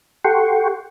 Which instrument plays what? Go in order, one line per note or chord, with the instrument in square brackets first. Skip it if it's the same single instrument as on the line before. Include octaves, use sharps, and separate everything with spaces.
[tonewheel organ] G4 A4 F#5 G5 C6 C#6